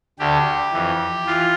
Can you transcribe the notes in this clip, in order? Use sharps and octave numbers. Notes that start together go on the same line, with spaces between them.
D2 D3 G4
F2 E3
E3 F4